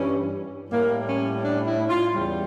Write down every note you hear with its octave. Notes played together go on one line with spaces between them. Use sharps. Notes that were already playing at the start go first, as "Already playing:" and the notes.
Already playing: G2 E3 G3 C#4
A2 G3 A#3
C#4
D4
E4
F4
E2 C#3 G3